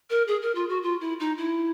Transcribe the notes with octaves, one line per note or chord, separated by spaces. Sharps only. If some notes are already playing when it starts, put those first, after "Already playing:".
A#4
G#4
A#4
F4
F#4
F4
E4
D#4
E4